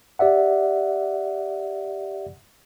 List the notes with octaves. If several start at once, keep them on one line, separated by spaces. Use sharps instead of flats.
G4 D5 E5 F#5